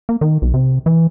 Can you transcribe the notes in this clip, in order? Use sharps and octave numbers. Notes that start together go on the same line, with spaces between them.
A#3
D#3
B1
C3
E3